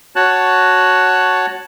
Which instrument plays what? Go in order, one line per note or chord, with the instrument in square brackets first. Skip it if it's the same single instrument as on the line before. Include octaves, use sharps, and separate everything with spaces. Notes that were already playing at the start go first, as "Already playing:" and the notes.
[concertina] F#4 C#5 A5 F#6